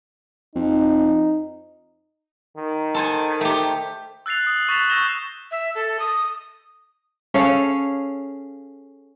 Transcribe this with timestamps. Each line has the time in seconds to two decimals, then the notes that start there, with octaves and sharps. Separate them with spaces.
0.55 F2 D#4
2.57 D#3
2.94 A4 C5 G#5
3.41 A3 G4
4.26 E6 F#6 A6 C7 F7
4.47 D#6 C7
4.69 C#6 F#6 A6 B6 E7 F7
4.90 C#6 E6 G6 A#6 E7 G7
5.51 E5
5.75 A4
6.00 D#6
7.34 C#4 G#4 A4 F5